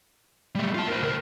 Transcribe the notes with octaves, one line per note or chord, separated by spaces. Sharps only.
G3 A3
F4 A5
A#4 C5
D2 A#4